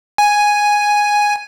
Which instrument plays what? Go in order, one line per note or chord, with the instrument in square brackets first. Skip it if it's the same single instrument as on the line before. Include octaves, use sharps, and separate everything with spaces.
[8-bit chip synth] G#5